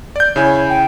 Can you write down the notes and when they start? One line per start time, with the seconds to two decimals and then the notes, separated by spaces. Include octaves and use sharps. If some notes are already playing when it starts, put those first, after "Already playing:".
0.16 D5 G6
0.36 C#3 E4 C#5 G#5
0.69 G5